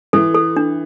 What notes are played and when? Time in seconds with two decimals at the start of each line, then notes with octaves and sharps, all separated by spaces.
0.13 E3 A4
0.35 A4
0.56 D4